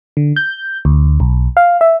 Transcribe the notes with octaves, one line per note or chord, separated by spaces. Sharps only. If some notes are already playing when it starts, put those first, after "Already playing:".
D3
G6
D2
B1
F5
E5